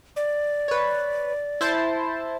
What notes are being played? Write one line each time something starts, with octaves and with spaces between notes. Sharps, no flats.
D5
B4 C#5
E4 C5 A5